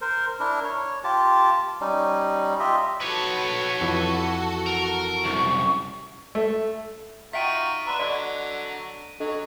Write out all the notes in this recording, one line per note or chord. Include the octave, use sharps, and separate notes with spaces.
A#4 C5
D4 E4 A#4
C#5
F4 G4 A5
G3 C#4 D#4
F4 G4 D#5 E5
F#4 A4 B4 C#5
F2 E3
A#4
C2 F#2 C#6
A3
D#4 F4 F#4 E5 G5 B6 D7 D#7
D4 B4 E5 A#5 C6
D3 F#3 D5 D#5
F#3 D4 A4 D#5